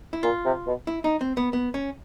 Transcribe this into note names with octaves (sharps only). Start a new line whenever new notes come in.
E4
A#2 F4
C3
B2
E4
D#4
C4
B3
B3
C#4